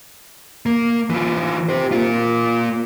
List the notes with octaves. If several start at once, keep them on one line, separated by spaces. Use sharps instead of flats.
A#3
E3 F4
G4 C5
A#3 F4